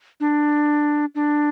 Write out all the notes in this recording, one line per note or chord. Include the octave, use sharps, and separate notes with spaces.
D4
D4